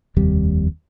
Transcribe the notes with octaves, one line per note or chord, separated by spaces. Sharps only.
F1 D#2 C3 G3